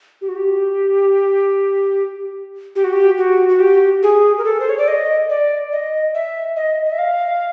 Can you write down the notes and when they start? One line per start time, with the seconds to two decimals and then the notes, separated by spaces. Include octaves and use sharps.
0.21 G4
0.29 F#4
0.36 G4
2.76 G4
2.84 F#4
2.93 G4
3.18 F#4
3.49 F#4
3.60 G4
4.03 G#4
4.38 A#4
4.44 A4
4.60 C5
4.69 C#5
4.78 D5
4.88 D#5
5.29 D5
5.72 D#5
6.15 E5
6.56 D#5
6.85 D#5
6.92 E5
6.98 F5